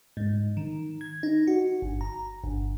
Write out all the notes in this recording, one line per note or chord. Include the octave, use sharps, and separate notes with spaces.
G#2
D#3
G#6
D#4
F#4
G1
A#5
G1